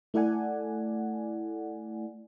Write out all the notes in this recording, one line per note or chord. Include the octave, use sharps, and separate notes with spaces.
A3 E4 A4 D5 F#5 G#5